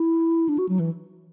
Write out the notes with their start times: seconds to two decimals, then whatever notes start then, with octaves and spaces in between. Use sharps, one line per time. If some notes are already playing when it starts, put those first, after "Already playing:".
Already playing: E4
0.49 D4
0.58 F#4
0.69 F#3
0.79 E3